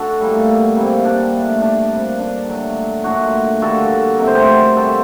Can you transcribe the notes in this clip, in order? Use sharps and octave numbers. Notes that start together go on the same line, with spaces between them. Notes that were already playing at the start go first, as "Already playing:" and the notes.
Already playing: D4 F#4 A4
A2 G3 A#3
C3 G3 A#3
D4
A2 A3
D4
C3 G3 A#3
D4
D3 F#3 A3
A#2 F#3 A3 D4 F#4
D3 G3 A#3 F#4 A4
C3 F#3 A3 A#4
C5
G4 A#4
C3 G3 A#3 F#4 A4